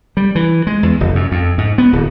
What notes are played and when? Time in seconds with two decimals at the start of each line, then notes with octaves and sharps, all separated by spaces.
0.17 G3
0.35 E3
0.67 G#3
0.83 E2
1.00 F1
1.15 F#2
1.32 F2
1.58 G#2
1.78 B3
1.92 D1